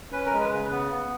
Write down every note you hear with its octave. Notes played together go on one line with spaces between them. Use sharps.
C#4 B4
A#4
G#3
B4
C#3
B3
B3